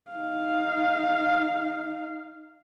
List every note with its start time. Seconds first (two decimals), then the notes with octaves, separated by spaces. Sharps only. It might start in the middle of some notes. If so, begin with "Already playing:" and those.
0.11 D#4 F5